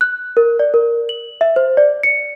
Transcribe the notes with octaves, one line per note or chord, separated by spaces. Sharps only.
F#6
A#4
D5
A#4
F#7
E5
C5
D5
C#7